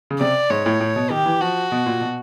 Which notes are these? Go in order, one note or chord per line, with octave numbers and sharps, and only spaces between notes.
C#3
C3 D5
G#2 C#5
A2
A2
B2
D#3 G4
E3
F3 F#4
B2
A#2
B2